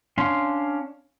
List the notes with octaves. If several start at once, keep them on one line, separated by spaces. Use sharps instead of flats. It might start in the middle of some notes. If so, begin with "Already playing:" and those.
C#4 D4 F5 C6